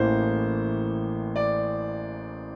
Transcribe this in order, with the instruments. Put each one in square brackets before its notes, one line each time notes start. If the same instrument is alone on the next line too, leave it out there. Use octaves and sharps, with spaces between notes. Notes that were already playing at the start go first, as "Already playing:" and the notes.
Already playing: [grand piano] A1 A2 E3 A#3 C5
D5